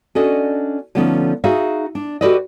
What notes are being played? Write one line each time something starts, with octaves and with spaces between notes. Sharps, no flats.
C#4 D4 F#4 A4 D5 D#5
D3 F3 A3 B3 C#4 D#4
D#4 F#4 G#4 E5 F5
D4
F#4 G4 A4 B4 D5 D#5